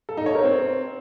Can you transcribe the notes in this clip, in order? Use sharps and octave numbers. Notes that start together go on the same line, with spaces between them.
A4
D#4
C#5
A#4
C4